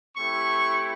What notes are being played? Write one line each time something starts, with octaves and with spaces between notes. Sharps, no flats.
A3 C4 E4 G4 C#6